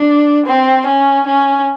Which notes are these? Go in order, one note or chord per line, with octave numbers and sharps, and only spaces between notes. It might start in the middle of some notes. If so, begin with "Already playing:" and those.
Already playing: D4
C4
C#4
C#4